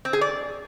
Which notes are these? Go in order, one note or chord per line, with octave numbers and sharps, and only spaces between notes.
C4
G#4
D5